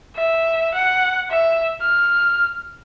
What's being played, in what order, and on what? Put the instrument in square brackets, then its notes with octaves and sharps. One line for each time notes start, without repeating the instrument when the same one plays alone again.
[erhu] E5
F#5
E5
F6